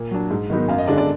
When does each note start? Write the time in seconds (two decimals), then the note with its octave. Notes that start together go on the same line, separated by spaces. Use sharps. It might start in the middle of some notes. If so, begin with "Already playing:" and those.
Already playing: A#2
0.11 F#3 D4
0.30 G#2
0.50 D#3 F#3 B3 D#4
0.68 F#2 F5
0.78 D#5
0.87 D3 G#3 D4 D5
0.98 D5